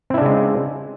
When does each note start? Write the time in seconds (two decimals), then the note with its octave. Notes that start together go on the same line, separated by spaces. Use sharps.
0.10 C4
0.14 E4
0.18 D4
0.22 C#3
0.25 G#3